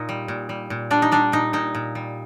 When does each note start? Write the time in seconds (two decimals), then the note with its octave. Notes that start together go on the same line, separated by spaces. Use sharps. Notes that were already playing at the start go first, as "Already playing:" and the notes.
Already playing: A#2 D#4
0.09 G3
0.28 A#2
0.49 G3
0.70 A#2
0.91 G3 D4
1.02 D#4
1.12 G3 D4
1.32 A#2 D#4
1.53 A#2 D#4
1.75 A#2
1.95 G3